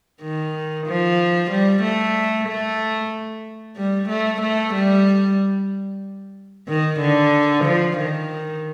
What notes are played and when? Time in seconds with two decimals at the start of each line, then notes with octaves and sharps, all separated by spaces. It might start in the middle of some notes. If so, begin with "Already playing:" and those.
0.22 D#3
0.87 F3
1.51 G3
1.83 A3
2.49 A3
3.77 G3
4.09 A3
4.42 A3
4.74 G3
6.68 D#3
7.00 D3
7.65 F3
7.98 D#3